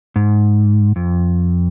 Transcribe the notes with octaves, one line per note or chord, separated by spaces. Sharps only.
G#2
F2